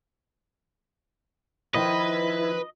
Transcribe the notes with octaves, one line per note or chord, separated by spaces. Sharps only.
D#3 F3 E4 B4 D#5